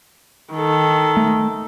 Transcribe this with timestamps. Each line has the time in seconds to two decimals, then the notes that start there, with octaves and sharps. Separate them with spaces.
0.53 D#3 A4
1.17 A3